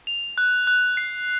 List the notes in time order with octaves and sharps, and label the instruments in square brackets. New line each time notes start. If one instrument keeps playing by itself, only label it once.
[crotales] F7
F#6
F#6
C7